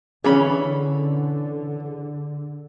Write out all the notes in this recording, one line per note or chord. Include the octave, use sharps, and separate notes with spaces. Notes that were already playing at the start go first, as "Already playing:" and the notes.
D3 E3 C#4 G#4 B5